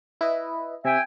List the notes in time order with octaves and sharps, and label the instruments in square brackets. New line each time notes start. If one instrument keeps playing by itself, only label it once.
[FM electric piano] E4 B4 D#5
[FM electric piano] C3 [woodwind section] E5 G5 G#5